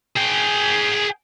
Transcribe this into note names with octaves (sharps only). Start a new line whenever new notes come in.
G#4 G5